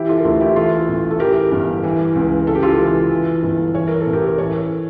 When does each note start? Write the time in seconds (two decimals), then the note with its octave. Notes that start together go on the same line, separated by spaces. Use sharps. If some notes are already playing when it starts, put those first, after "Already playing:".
Already playing: E3 E4 G4
0.09 F4 A4
0.18 A#4
0.25 D2 F4 A4
0.40 E4 G4
0.56 E3 F4 A4
0.89 A1
1.10 A4
1.20 E3 G4 A#4
1.52 G1
1.83 E3
2.16 C#2
2.47 C#3 A4
2.55 G4
2.63 F4 A4
2.80 E3
3.11 E3
3.43 G1
3.75 E3 C#5
3.87 A#4
4.00 A4
4.06 A1
4.13 G4 A#4
4.27 A#4
4.38 E3 A4 C#5